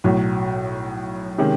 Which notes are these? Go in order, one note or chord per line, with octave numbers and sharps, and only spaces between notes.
B1 A2 F#3
C3 D#3 G#3 C#4